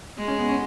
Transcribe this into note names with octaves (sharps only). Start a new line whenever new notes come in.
G#3
C#4
B3
C#4